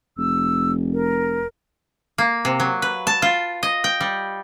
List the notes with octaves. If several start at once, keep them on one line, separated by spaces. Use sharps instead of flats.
F1 E6
A#4
A#3
C3
F#3
B4
A5
F4
D#5
G5
G3